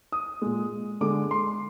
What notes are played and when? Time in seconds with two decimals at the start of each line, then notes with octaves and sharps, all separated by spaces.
0.12 D#6
0.42 A#2 G#3
1.01 D3 G#3 D6
1.31 C6